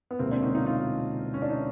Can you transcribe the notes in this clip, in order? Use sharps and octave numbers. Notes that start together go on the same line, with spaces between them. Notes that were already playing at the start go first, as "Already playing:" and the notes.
B3
E1 D2 C3 A#3 C4
C4 D4
C#4 D#4
D#4 F4
D#4 F4
C#4
D4
D#4